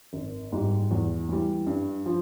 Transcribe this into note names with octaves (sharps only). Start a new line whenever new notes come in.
G#1
G#2 G3
E2
E3 G3
G2
F3